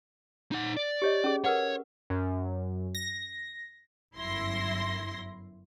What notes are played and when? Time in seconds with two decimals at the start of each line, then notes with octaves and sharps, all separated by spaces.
0.52 D#4 F#5
0.77 D5
1.02 G4 C#5 D#5
1.24 C#4 G#4
1.44 A#4 B4 C#5 F#5
2.10 F#2
2.95 A#6
4.15 G1 F#2 E4 C6 A#6